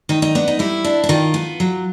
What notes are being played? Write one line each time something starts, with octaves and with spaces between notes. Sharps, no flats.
D#3 D#4
D#4
B3 D4
D#4
G3 E4
D4
E4
D#3 F4
B3
F#3